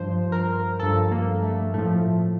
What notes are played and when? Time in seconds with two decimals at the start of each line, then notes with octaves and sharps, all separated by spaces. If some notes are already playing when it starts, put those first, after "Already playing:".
Already playing: G2 F3 C5
0.32 A#4
0.80 G2 F3 A4
1.11 A#3
1.43 A3
1.74 A2 F3 A3